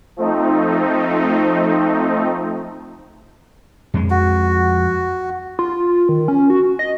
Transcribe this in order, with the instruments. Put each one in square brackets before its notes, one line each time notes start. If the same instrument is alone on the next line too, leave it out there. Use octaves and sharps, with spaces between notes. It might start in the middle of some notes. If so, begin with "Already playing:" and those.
[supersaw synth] F3 A3 C4 D#4
[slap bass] F2 G#3
[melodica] F#4
[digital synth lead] F4
D#3
C#4
F#4
D#5